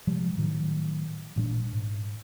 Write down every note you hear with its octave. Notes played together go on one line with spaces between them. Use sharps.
C3 F3 G3 G#3
A2 D#3 F#3
A1 A#2 G3 D4
G#2